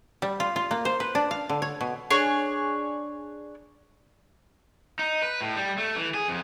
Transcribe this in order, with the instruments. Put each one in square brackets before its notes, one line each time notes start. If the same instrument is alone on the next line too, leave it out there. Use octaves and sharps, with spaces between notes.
[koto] G3
F4
F4
A#3
C5
B4
D4
F5
D3
C#5
B2
[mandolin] D4 G#4 C#5
[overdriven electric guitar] D#4
B4
A2
G3
A3
E3
G#4
F2